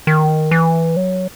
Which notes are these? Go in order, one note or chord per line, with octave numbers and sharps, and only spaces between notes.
D#3
E3
F#3